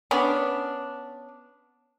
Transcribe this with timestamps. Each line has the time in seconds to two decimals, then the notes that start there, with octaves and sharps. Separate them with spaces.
0.11 B3 C#4 D4